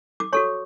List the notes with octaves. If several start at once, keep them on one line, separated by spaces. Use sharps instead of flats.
D6
F#4 A4 C#5 C#6